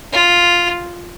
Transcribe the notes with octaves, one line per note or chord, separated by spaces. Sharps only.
F4